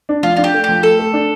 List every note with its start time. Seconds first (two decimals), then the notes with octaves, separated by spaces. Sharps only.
0.09 D4
0.23 F3 F4
0.37 D4 F4
0.44 G4
0.54 A3
0.64 F3 G4
0.83 A3 A4
0.99 A3
1.13 D4